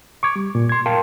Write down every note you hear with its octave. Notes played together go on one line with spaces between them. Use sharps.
C#6 D6 G#6
G3
A#2
C6 G#6
A#4 F5 G5 A5 C6